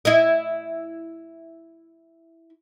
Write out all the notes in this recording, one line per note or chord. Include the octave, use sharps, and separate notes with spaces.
E4 D#5